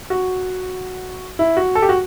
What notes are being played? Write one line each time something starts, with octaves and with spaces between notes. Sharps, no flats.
F#4
E4
F#4
A4
G4
F#4